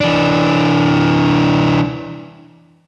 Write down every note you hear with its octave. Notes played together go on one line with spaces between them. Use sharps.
E3 D4